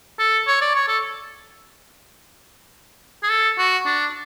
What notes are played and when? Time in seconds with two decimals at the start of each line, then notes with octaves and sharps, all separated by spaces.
0.19 A4
0.47 C#5
0.61 D5
0.76 C#5
0.89 A4
3.23 G#4
3.29 A4
3.58 F#4
3.86 D4